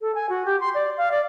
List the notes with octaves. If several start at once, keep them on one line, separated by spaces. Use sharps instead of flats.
A4
G#5
F#4
G4
C6
D5
F5
D5